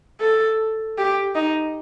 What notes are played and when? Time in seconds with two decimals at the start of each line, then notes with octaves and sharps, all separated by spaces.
0.21 A4
0.98 G4
1.35 D#4